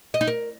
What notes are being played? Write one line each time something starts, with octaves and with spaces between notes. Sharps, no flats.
D#5
D#4
A#4